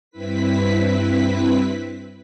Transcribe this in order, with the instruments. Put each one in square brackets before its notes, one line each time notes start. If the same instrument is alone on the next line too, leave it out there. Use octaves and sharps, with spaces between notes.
[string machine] G2 C4 E4 B4 B6